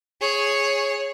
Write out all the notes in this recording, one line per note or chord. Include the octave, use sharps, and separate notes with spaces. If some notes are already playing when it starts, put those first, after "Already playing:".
G#4 C#5